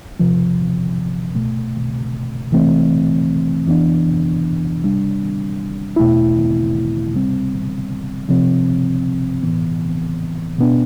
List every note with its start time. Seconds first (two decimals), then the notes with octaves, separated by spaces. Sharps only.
0.19 E2 C3 F3
1.35 C2 B2 A3
2.51 D2 C3 E3 A3 C4
3.66 F2 E3 B3 D4
4.82 C3 G3 D4
5.96 E2 B2 A3 E4
7.12 C2 C3 G3 C4
8.29 C3 F3 C4
9.43 A2 E3 B3
10.58 B2 B3 D4